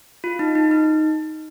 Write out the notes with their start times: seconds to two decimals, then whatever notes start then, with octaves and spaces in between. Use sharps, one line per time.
0.24 F4
0.39 D#4
0.55 D#4
0.71 D#4